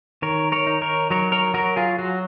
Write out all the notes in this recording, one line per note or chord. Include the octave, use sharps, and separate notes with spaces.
D#3 A#4 C#5
A#4 C#5
D#4
A#4 C#5
F#3 A#4 C#5
A#4 C#5
F#3 F#4 A#4
F4 G#4
F#3 F#4